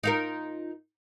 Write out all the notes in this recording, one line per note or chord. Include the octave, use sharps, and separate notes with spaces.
D#4 F4 A#4